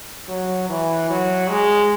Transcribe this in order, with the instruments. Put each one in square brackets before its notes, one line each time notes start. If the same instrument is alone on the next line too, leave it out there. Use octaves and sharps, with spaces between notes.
[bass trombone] F#3
E3
F#3
G#3